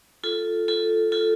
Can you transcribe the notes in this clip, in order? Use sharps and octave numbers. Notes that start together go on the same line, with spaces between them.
F4 A4
F4 A4
F4 A4